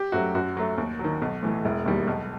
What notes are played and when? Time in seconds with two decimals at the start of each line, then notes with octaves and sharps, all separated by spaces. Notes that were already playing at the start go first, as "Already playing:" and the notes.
Already playing: G4
0.12 F#2 F#3 A3 F#4
0.35 F#2 F#4
0.57 F#3 A3
0.78 D#2
0.99 F#3
1.04 D#3
1.22 B1
1.43 A2 E3 A3
1.65 E1 E4
1.86 D#2 D#3 G3
2.07 B1